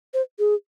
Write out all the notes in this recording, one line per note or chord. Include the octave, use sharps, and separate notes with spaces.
C5
G#4